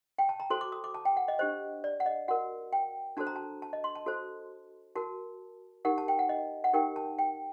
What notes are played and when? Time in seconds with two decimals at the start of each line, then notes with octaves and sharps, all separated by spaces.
0.19 G5
0.29 A5
0.40 A#5
0.50 F#4 A4 C5 C6
0.61 D6
0.72 D#6
0.84 D6
0.94 A5
1.05 G5
1.17 F#5
1.28 D#5
1.39 D4 G4 C5 D#5
1.84 D5
2.00 F#5
2.06 D#5
2.28 F#4 A#4 F#5
2.73 G5
3.17 D4 F#4 A4 C5 A5
3.27 A#5
3.36 A5
3.62 A5
3.73 D#5
3.84 C6
3.95 A5
4.06 F#4 A4 C5
4.96 F#4 A#4 A5
5.85 D#4 G4 A#4 F#5
5.98 A5
6.08 G5
6.19 F#5
6.29 D#5
6.64 F#5
6.73 D#4 G4 A#4 G5
6.96 A5
7.19 G5